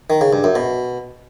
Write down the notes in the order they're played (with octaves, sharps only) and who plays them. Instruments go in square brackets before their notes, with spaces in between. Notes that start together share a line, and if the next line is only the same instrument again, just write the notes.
[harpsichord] D#3
C#3
G2
F#2
B2